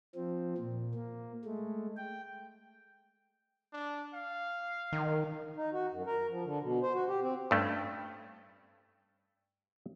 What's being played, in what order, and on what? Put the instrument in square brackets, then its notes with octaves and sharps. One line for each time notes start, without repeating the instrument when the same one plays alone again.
[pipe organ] F3 C4
A#2
A#3
G#3 A3
G5
[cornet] D4
F5
[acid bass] D#3
[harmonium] D#4
F#4
F#2
A#4
F3
D3
B2
C5
F#4
G4
C4
[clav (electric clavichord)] G2 A3 C#4